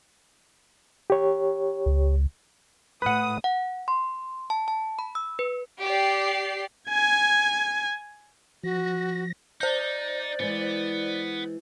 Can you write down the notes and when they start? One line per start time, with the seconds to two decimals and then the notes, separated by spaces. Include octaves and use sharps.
1.10 G4 C#5
1.86 C#2
3.02 A2 B4 F#5 D#6
3.44 F#5
3.88 C6
4.50 A5
4.68 A5
4.99 B5
5.15 E6
5.39 B4
5.82 G4 D5 C7
6.89 G#5 G#6
8.63 F3 F#4 A#6
9.61 D#4 C5 D5 G6
10.40 E3 G#3 B3